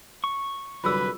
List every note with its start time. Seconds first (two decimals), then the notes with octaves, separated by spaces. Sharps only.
0.24 C#6
0.84 C2 F#2 D3 F4 G#4 B4 E6